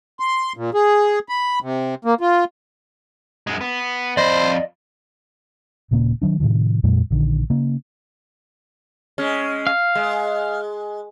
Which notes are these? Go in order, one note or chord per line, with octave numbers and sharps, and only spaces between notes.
C6
A#2
G#4
B5
C3
A#3
F4
F#2 G#3
B3
F2 C5 D5 D#5 B5
D#1 A#2 C#3 A#3
D#3 F#3 D4
A2 C3 D#3 F3
F2 A#2 F#3 G#3
A#1 D3 D#3
C#3 A#3
G#3 C#4
F5
G#3